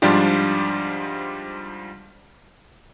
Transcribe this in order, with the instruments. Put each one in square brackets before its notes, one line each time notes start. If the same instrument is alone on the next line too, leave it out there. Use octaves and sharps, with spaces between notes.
[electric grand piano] G#2 F3 G3 D4 F4 G4